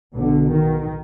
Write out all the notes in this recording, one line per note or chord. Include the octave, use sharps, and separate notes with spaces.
B1 B2 D3
D#3